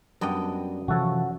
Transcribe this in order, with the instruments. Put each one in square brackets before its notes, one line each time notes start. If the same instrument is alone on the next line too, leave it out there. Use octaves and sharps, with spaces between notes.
[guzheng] F#2 D#5 G5 [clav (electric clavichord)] G3 B3 D4
[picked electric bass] C3 E3 F3 [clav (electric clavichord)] F#4 A4 C#5